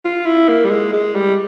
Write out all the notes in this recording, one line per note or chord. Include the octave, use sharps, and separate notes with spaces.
F4
E4
A#3
G3
G#3
G#3
G3